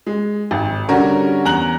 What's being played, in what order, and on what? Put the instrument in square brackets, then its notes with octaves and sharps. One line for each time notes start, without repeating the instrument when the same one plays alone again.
[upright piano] G#3
G#1
D3 G3 C#4 F#4 A#4 C#5
E2 A#5 F#6 F#7